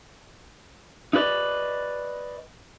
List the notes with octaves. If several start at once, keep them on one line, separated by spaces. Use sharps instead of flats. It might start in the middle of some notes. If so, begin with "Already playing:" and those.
D#4 E4 B4 D5 D#5